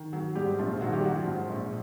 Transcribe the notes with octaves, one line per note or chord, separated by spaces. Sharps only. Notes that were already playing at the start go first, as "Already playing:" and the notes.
Already playing: D#3
F#3
G#2 G3 G4
A#1 F3 F4
D#3 F#3 F#4
G3 G4
F#3 F#4
F3 F4
G#2
A#1